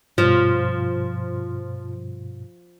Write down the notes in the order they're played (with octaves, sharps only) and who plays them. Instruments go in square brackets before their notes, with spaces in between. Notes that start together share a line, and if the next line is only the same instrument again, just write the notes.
[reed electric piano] G2 B2 [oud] F3